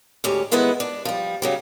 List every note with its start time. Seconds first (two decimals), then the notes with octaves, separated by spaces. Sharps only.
0.24 D2 G#2 C#4 G4
0.51 D#3 G#3 B3 E4 B4 F#5
0.80 D4
1.05 F3 G3
1.42 C#3 F#3 G3